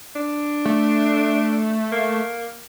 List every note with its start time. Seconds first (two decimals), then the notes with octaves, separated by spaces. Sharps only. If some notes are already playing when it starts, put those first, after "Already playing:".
0.15 D4
0.65 A3
1.92 A#3